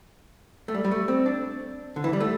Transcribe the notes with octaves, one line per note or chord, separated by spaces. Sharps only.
A3
G3
G3
A3
C4
D4
D3
E3
G3
A3